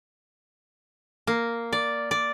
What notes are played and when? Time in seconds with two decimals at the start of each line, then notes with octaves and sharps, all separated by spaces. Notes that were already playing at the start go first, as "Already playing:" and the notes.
1.27 A#3
1.73 D5
2.11 D5